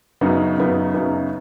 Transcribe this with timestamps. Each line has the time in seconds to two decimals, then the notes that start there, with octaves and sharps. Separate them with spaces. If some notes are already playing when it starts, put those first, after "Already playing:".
0.21 F#2 C#3 F#3 B3 D#4
0.58 F#2 C#3 F#3 B3 D#4
0.93 F#2 C#3 F#3 B3 D#4